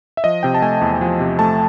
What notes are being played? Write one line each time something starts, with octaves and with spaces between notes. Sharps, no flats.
E5
F3 D#5
C3 G5
A5
A3 G#5
E2
F3
C3
A3 A5